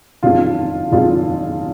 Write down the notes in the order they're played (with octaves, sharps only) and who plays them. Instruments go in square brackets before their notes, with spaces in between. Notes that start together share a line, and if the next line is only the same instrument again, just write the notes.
[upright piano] F#1 F2 D#3 G#3 F4
F#1 F2 D#3 G#3 F4